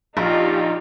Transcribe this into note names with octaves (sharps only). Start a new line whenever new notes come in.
A#1 D#4 F4 G4